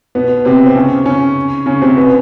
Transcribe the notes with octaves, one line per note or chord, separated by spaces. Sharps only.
B2 B3
C3 C4
C4
C#3 C#4
C#3 C#4
C#3 C#4
C3 C4
B2 B3